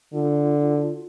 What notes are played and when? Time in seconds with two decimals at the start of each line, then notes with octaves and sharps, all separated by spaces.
0.13 D3 F4